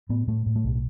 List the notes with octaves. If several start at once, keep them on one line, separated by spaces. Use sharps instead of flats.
A2 B3
A2 A3
A2
A3
B1